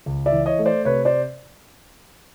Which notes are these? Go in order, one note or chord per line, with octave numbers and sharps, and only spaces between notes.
C#2
D5 E5
E3
C#5 D#5
A3
C5 D5
C3 B4 C#5
C5 D5